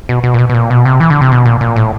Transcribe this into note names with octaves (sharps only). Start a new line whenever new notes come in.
B2
B2
A#2
B2
B2
A#2
B2
C3
E3
D3
C3
B2
A#2
A#2
A2